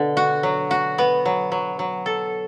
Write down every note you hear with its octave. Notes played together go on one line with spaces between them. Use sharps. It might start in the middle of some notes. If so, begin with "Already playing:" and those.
Already playing: B2 D3
F#4
F#3
F#4
B3
F#3
F#3
F#3
A4